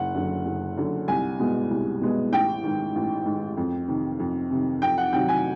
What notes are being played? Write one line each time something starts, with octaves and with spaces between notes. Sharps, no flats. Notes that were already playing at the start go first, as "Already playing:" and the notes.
Already playing: F#1 F#5
F#2 D3
F#1
F#2 D3
C2 G#5
B2 G#3 B3
C2
B2 G#3 B3
A1 G5
G#2 D#3
A1
G#2
D#3
F2
C3 D#3
F2
C3 D#3
F2 G5
F#5
C3 D#3 F#3 G5
G#5